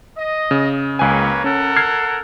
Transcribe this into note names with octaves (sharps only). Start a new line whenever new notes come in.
D#5
C#3
C#2 A#3 B4 C#5 G#5
C#4 A4 A#4 F#5
F6 G#6 C7